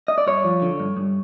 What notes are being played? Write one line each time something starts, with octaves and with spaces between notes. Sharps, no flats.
D#5
D5
G2 C#5
F3
D3
G2
G2